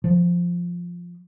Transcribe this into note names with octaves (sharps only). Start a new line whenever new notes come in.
F3